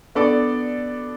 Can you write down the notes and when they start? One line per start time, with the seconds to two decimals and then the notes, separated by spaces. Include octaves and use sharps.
0.15 B3 D4 A4 D5